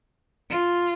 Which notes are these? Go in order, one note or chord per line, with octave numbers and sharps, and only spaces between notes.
F4